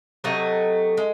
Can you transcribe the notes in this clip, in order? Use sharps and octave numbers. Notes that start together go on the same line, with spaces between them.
C3 F#3 A3 D#5
G#3